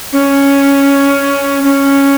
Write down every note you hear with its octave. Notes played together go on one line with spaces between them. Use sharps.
C#4
C#4